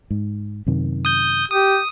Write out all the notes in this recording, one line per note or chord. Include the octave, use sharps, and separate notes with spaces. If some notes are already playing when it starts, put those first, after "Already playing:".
G#2
F#2 C3 D#3
D#6 G6
G4 D#6